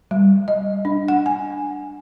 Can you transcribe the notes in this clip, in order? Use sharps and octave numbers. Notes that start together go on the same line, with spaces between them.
G3
D#5
D4
F#5
G#5